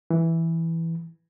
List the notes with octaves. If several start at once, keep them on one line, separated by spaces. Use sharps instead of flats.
E3